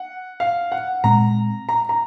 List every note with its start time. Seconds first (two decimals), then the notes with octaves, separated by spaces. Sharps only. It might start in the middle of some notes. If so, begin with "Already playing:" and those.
Already playing: F#5
0.40 F5
0.72 F#5
1.04 A#2 G#3 C4 A#5
1.69 A#5
1.89 A#5